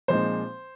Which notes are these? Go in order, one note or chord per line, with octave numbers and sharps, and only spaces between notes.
A#2 F3 G#3 C4 D#4 C5